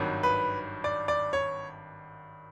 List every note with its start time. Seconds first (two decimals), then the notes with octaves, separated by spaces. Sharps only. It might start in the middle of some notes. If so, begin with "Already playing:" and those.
Already playing: G#1 G2 D#3 F#3
0.23 B4
0.84 D5
1.08 D5
1.33 C#5